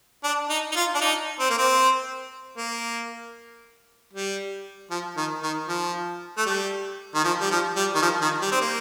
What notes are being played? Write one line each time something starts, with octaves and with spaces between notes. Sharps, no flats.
D4
D#4
D#4
F4
D4
D#4
C4
A#3
C4
A#3
G3
F3
D#3
D#3
F3
A3
G3
D#3
F3
G3
F3
G3
D#3
F3
D#3
G3
C4
A#3